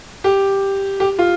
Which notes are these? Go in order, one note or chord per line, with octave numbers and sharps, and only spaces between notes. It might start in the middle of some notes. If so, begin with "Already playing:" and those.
G4
G4
F4